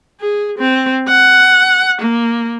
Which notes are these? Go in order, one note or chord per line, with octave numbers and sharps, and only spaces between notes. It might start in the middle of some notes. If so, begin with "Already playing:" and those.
G#4
C4
F#5
A#3